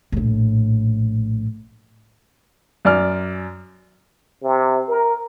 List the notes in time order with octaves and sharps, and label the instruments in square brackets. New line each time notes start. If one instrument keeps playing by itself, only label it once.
[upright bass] A#1 A2
[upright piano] F#2 D5 F6
[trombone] C3
A#4